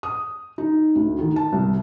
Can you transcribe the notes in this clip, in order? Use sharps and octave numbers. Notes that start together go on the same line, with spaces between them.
D#6
D#4
D2
D#3
A5
C2